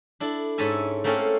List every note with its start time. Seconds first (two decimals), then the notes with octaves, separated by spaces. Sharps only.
0.20 D4 E4 A4
0.58 G#2 C#4 A4 E5 G#5
1.04 A3 A#3 C4 C#4 A4 A#4